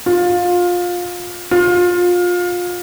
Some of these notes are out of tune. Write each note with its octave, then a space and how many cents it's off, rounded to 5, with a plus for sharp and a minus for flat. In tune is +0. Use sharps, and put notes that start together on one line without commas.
F4 +20
F4 +25